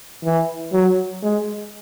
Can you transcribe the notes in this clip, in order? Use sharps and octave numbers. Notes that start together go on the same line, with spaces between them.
E3
F#3
G#3